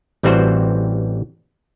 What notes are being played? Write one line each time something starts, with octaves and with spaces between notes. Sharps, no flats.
A1 E3 G3 C4 F#4 C5